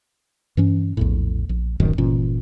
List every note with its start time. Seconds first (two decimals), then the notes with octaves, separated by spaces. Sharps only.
0.57 G2 E3 C#4
0.97 A#1 E2 A2
1.49 A#1
1.80 D1 A1 F#2 D#3
1.98 G1 A#2 E3 C#4